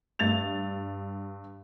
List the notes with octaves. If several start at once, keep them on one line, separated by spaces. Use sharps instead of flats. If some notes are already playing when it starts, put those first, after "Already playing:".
G2 A6 F7